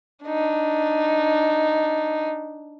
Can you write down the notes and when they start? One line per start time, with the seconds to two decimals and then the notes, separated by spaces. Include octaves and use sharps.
0.24 D4 D#4